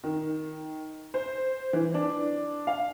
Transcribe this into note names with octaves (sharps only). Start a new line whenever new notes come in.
D#3
C5
E3
D4
F5